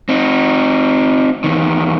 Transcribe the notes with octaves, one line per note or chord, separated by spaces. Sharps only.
C4 D#4
E2 D#3